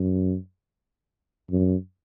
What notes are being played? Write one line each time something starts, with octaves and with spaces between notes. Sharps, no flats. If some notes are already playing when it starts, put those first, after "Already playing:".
Already playing: F#2
F#2